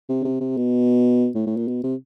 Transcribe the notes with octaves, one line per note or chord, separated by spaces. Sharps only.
C3
C#3
C3
C3
B2
A2
A2
A#2
B2
C3